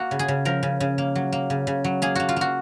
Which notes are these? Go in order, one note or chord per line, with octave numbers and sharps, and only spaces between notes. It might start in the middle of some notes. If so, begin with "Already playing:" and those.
Already playing: A#3 F#4
C#3
G#4
C#3
F3 A#4
C#3
C#3
A#3
F#3
A#3
C#3
C#3
F#3
A#3 G#4
A#3 F#4
F4
A#3 F#4